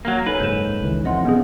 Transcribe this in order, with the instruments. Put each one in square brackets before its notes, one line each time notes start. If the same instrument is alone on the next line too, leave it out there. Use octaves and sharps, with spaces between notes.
[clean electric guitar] F#3 A#3
[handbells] D#4 [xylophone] A4 C#5 G#5 [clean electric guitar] B4
[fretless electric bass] F#1 G#2 [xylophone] G6 E7
[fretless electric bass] C#2 D#3 E3
[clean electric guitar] F2 [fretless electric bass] E3 [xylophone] D#5 F#5 C6
[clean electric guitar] B1 [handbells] B3 C#4 G#4